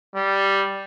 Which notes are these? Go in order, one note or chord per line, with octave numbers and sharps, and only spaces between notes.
G3